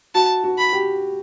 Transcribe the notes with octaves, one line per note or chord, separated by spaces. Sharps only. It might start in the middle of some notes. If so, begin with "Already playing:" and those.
F#4 A5
F#4
B5
G4